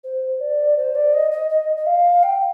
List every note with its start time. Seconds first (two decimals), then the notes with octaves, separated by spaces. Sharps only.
0.04 C5
0.40 D5
0.77 C5
0.95 D5
1.13 D#5
1.31 D#5
1.49 D#5
1.77 D#5
1.86 F5
2.23 G5